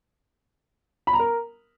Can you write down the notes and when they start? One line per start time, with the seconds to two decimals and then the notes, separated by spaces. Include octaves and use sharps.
1.07 B5
1.13 A#5
1.19 A#4